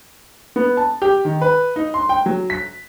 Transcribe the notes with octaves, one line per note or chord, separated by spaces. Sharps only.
B3
A5
G4
D#3
B4
D#4
C6
G5
F#3
B6